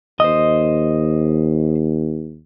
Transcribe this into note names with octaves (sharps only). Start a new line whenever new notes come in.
D#2 C5 D#5